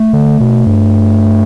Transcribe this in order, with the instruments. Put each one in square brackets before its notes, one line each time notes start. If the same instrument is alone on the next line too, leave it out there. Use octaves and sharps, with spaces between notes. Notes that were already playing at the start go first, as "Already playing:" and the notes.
Already playing: [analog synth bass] A3
[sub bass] D3
B2
G2